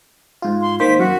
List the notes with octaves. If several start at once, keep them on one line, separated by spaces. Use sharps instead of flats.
G#2 F4
C6
D#3 A#3 C5 B6
F#2 F#4